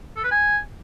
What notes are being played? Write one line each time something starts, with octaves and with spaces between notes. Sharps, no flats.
A4
B4
G#5